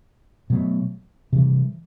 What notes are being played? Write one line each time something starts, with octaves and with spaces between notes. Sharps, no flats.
B2 F#3 A3
C3 E3 G3